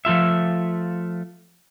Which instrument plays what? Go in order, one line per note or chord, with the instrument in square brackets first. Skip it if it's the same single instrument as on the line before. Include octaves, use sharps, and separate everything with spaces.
[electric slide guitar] F3 A3 F4 E5